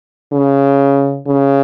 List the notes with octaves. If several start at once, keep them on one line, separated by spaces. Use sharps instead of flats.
C#3
C#3